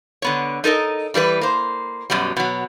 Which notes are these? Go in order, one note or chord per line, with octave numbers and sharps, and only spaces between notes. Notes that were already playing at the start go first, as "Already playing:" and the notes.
D3 B3 C#5
D#4 A4 A#4 D#5
E3 G3 E4 B4
A#3 C5
F#2 B2 F#3 G3
B2 F#3